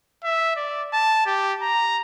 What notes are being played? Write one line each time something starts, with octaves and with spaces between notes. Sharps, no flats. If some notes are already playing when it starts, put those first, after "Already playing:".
E5
D5
A5
G4
A#5